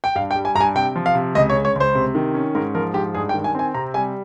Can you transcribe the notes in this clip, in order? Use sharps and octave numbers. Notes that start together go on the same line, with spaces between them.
G5
G2 F5
G5
G3
G#5
G2 A#5
G#5
C3 G5
F3
F5
C3
C#2 D#5
C#5
C#3
C#5
C#2 C5
C3
D#3
C#4
G#2 A#4
F3 A#4
G#2 G4
G2 G#4
G5
D#3
G#5
C4 G#5
C3 A#5
G3 G#5